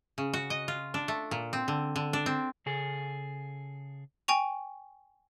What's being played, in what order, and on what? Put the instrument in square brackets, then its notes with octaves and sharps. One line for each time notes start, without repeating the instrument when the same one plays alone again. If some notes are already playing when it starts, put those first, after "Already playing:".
[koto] C#3
F#4
D#5
F4
D4
A3
A#2
C4
D3
D3
D4
C4
[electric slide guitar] C#3 G#4 A4
[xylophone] G5 G#5 C#6 F7